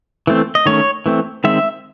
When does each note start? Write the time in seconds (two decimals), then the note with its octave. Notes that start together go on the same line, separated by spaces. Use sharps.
0.27 E3 A3 C4
0.55 D#5
0.66 D#3 A3 C#4 C#5
1.06 E3 A3 C4
1.44 D#3 G#3 C4 E5